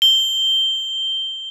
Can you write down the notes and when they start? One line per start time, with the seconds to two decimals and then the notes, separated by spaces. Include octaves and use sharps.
0.02 G7